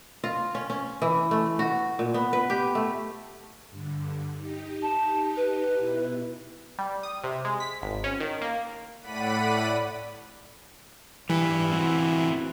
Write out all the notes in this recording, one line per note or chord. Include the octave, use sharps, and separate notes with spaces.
F4
C#4
C#4
E3
A3
F#4
A#2
B3
B4
G4
A3
G2 D3
D#4 G4
A5
B4
B2 E4
G3
D#6
C3
G#3
B6
G#1
C#4
D#3
A#3
A2 D5 F#5 B5 B6 D#7
E3 G3 B4
C4 E4 F#4